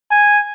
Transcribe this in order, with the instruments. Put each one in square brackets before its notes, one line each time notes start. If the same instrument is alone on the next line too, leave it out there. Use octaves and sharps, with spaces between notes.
[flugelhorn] G#5